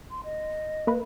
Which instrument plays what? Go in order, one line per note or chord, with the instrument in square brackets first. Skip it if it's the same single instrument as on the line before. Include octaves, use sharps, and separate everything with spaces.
[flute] C6
D#5
[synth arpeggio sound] A#3 B4